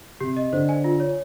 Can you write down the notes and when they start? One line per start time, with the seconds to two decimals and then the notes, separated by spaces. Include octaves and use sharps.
0.20 C3 G4
0.37 D#5
0.53 D3 C5
0.69 G#5
0.84 F4
1.00 C#5